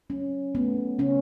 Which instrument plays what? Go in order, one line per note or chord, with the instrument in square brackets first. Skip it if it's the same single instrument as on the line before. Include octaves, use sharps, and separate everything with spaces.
[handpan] F#3 C#4
A3 B3
C#3 C#4